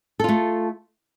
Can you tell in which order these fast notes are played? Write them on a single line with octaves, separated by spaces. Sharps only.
A4 F4 A3